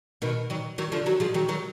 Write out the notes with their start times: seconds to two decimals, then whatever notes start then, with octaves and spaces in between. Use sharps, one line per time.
0.22 B2 D#3
0.50 D#3 F#3
0.78 D#3 F#3
0.92 D3 F3
1.06 D#3 F#3 F#4
1.20 F3 G#3
1.34 D#3 F#3
1.48 D#3 F#3